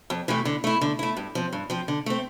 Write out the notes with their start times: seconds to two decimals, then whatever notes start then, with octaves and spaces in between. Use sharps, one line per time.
0.10 F2
0.28 C3 E3 A3
0.45 D3
0.64 A3 E4
0.81 D3
0.99 A3 E4
1.17 G2
1.35 F3 C4
1.53 G2
1.70 F3 C4
1.88 D3
2.06 A3 C4